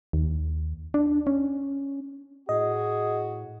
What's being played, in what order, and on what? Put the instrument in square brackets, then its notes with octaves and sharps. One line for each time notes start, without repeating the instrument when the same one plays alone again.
[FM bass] D#2
D4
C#4
[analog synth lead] A2 [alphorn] F#4 [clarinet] G#4 [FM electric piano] D#5